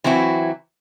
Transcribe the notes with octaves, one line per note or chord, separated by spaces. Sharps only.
E3 F#3 C4 E4 F#4